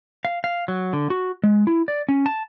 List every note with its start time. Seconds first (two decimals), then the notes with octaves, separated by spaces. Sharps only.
0.25 F5
0.44 F5
0.68 F#3
0.93 D3
1.10 F#4
1.44 G#3
1.67 E4
1.88 D5
2.09 C#4
2.26 A5